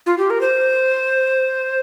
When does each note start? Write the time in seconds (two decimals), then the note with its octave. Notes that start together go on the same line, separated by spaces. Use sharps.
0.06 F4
0.18 G4
0.30 A#4
0.41 C5